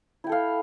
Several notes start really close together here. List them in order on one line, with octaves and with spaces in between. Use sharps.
E4 G5 A4 F5